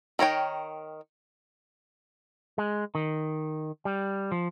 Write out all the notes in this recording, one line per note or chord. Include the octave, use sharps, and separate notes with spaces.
D#3 A#4 C#5 G5
G#3
D#3
G3
F3